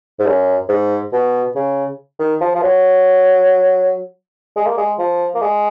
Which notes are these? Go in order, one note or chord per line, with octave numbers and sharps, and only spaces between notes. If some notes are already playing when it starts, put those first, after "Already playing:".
G#2
F#2
G#2
B2
C#3
D#3
F3
F3
F#3
G#3
A#3
G#3
F3
A#3
G#3